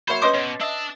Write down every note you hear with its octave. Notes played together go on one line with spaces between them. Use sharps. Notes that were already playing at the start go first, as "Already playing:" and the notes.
F#3 A#3 C5 C#5 E5 B5
C#4 B4 D#5 C6 D6 D#6
B2 C#5
D4 D#5 E5 A5